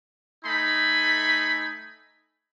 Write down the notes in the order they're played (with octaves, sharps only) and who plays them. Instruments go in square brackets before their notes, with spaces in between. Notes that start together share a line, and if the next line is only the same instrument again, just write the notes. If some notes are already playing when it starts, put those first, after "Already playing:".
[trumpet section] A3 D#4 G#5 B5